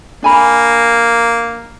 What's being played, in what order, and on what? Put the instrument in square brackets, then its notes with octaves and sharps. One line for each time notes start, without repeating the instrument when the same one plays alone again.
[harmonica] A#3 [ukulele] D4 G#5 B5